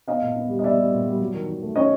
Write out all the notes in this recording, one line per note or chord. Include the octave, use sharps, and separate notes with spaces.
B3 D#5 F5
A#2
B3
G3
D#5
B3 D5 E5
G3
A#2
G3
F#3
D#3
D#3
A3
C#4 C#5 D#5